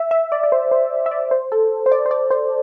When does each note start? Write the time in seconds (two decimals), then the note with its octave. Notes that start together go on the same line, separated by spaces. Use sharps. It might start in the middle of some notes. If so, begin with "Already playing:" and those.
Already playing: E5
0.11 E5
0.32 D5
0.43 D5
0.52 C5
0.71 C5
1.06 E5
1.11 D5
1.31 C5
1.52 A4
1.86 C5
1.92 D5
2.06 C5
2.11 D5
2.31 C5